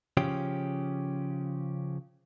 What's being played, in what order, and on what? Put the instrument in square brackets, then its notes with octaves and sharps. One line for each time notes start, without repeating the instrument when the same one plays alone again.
[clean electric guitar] C#3 F3 C#4 G4